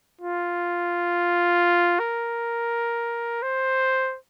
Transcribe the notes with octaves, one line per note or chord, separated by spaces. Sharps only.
F4
A#4
C5